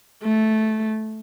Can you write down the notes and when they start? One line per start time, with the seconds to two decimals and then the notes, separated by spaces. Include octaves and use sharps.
0.23 A3